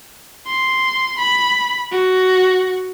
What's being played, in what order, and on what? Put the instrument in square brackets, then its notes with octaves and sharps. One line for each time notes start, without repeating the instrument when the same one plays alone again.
[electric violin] C6
B5
F#4